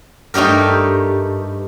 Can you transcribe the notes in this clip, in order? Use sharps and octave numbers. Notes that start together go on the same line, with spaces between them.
G2 A3 D#4 G4 A#4